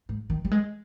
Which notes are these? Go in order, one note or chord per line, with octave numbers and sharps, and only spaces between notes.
G#2
D#3
G3
G#3